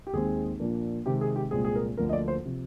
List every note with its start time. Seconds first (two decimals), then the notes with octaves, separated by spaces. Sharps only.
0.07 G4
0.13 D#2 D#3 G#3 C4 G#4
0.60 A#2 F3 A#3 D4
1.06 C3 D#3 G#3 C4 G4
1.21 G#4
1.36 G4
1.51 C2 A#2 G#3 C4 G#4
1.65 G#4
1.75 A#4
1.97 D2 D3 F3 A#3 A#4
2.09 D#5
2.13 D5
2.28 C5
2.45 C3 F3